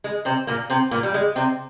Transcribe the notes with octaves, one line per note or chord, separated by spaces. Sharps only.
G#3
C3 C4
A#2 A#3
C3 C4
A#2 A#3
G3
G#3
C3 C4